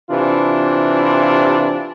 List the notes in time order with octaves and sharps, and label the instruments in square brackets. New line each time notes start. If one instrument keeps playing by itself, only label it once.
[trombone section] C3 E3 D4 F4